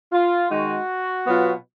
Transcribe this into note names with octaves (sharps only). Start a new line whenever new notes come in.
F4
D#3 G#3 D#4 F#4
B2 F#3 B3 F4